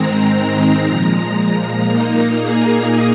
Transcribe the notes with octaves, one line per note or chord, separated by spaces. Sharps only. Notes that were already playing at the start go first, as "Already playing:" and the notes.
Already playing: G#2 D#3 G#3 C4 A#5
A#2 F3 G#3
A#5
A#2 A#3 D#4
G#4